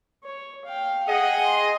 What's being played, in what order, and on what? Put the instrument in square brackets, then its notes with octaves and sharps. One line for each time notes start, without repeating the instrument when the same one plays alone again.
[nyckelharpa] C#5
F5 G5
[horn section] G#4 D#5 [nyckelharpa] F#5 G5
[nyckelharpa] C6